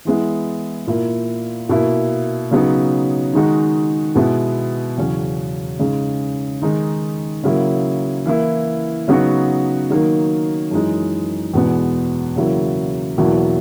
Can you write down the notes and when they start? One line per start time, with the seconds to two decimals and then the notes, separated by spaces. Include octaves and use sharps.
0.05 E3 G#3 B3 E4
0.87 A#2 A#3 E4
1.69 B2 A#3 E4
2.51 C#3 F#3 B3 D#4
3.33 D#3 G#3 D#4 F#4
4.15 B2 G#3 B3 E4
4.97 E2 C#3 F#3 C#4
5.80 C#3 G#3 D#4
6.62 D#3 G#3 D#4
7.44 C#3 F#3 A#3 E4
8.26 E3 A#3 E4
9.08 C#3 F#3 B3 D#4 F#4
9.90 D#3 F#3 A#3 D#4
10.71 F#2 E3 G#3 D#4
11.54 E2 B2 G#3 B3
12.36 E2 C#3 F#3 A#3 E4
13.18 E2 B2 F#3 A#3 E4